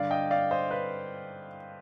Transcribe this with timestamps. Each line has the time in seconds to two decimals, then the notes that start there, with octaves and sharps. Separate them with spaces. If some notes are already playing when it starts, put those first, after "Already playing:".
Already playing: G2 D3 D5 F5
0.11 D#5 G5
0.31 D5 F5
0.51 C5 D#5
0.70 B4 D5